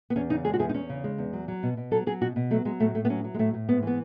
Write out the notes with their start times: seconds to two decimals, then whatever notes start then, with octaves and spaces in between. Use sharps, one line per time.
0.10 B3
0.16 E2 C#4
0.30 C#3 D#4
0.45 G#3 G#4
0.54 F#4
0.59 E2 G#4
0.69 D#4
0.74 E2 C#4
0.89 C#3
1.04 G#3
1.18 E2
1.33 F#3
1.48 F#3
1.63 B2
1.77 B2
1.92 F#3 A4
2.06 F#3 G#4
2.21 B2 F#4
2.36 B2
2.51 F#3 A3
2.65 F#3 G#3
2.80 A2 A3
2.95 A2 A3
3.05 B3
3.09 F#3 C#4
3.24 F#3
3.34 G#3
3.39 A2 A3
3.54 A2
3.69 G#2 B3
3.83 E3 B3